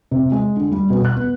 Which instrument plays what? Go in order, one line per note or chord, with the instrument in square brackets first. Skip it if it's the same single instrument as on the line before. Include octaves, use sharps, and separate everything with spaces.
[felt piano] C3
G#3
D3
G3
B2
F#6
B3